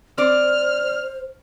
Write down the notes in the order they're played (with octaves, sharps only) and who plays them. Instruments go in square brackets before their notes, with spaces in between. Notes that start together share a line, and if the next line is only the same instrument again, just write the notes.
[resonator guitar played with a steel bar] C4 D5 [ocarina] C5 [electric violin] F6